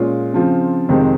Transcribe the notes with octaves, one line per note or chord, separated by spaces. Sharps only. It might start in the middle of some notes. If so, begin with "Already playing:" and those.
Already playing: A#2 G#3 C#4 F4
C#3 F3 C4 F4
F2 C3 D#3 G#3 C4